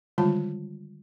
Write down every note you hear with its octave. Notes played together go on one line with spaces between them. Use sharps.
D3 D#3 G3 G#3 F4 A5